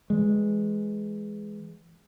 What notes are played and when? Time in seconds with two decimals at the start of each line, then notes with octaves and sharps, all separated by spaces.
0.10 E3 G#3